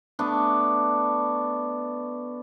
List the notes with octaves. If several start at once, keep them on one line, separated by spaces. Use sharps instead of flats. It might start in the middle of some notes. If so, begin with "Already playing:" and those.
A3 B3 D4